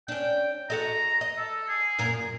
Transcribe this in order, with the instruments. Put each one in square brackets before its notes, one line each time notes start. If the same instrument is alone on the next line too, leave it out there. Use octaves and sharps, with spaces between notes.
[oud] C#4 D4 [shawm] G5
[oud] F#4 A4 D#5 [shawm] A#5
[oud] D#5
[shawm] A4
G#4
[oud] F#2 A#2 A#4